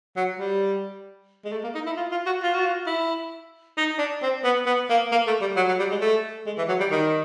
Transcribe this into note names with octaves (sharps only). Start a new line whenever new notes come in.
F#3
G3
G#3
A3
A#3
D#4
E4
F4
F4
F#4
F4
F#4
F4
E4
D#4
D4
C4
B3
B3
A#3
A#3
A3
G3
F#3
F#3
G3
G#3
A3
G#3
E3
F#3
G3
D#3